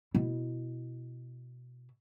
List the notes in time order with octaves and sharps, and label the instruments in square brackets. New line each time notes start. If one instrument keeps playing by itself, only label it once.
[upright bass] B2 E4